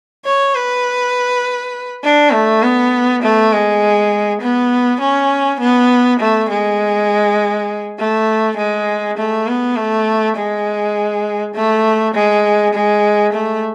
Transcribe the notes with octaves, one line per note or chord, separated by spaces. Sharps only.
C#5
B4
D4
A3
B3
A3
G#3
B3
C#4
B3
A3
G#3
A3
G#3
A3
B3
A3
G#3
A3
G#3
G#3
A3